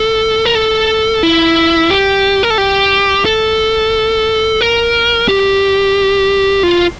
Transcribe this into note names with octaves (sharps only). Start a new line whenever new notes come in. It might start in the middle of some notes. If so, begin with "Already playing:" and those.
Already playing: A4
A#4
A4
E4
G4
A#4
A4
G4
A4
A#4
G4
F4